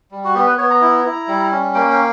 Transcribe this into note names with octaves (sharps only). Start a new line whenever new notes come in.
G3
F#4
B3 G4
B4
B3 C#5
A#5
E4
E4
G3
C#4
A#3 G5
G5